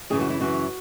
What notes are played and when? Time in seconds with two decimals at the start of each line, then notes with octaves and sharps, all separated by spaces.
0.10 F#2 C#3 E3 G#4
0.21 F#4
0.30 E4
0.40 F#2 C#3 E3 F#4